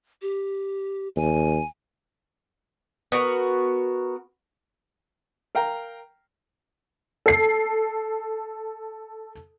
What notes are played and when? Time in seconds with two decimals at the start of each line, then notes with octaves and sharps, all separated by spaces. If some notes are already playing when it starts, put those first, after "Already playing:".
0.22 G4
1.16 D#2 G#5
3.12 B3 F#4 A#4
5.55 A#4 F5 G5 A#5
7.26 A4 C7